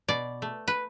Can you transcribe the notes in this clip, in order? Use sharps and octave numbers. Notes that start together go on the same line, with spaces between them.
B2 D5
A3
B4